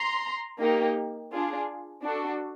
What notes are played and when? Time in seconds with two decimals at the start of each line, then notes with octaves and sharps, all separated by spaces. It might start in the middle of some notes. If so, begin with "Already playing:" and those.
Already playing: A#5 C6
0.60 A#3 D#4 G4
1.32 D4 F4 G#4
2.03 D4 F#4 A4